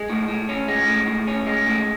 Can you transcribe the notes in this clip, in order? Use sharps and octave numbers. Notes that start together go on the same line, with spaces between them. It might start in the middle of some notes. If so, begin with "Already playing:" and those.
Already playing: G#3
A2
A2
C#4
G#3
A2
A2
C#4
G#3
A2